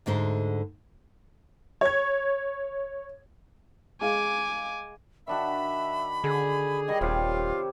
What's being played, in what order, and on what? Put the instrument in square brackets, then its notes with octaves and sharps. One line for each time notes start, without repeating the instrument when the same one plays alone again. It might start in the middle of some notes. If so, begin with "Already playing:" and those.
[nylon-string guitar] D2 G#2 D3 C5
[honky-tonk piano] C#5 G#6
[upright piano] G#3 F5 [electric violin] G#5 D6
[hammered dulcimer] D#3 D4 F#4 [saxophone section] E5 [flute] B5
[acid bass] D3 [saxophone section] G#4
[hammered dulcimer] D#3 G3 [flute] D#5
[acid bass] D#1 [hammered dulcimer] C3 G4 C#5 [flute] F4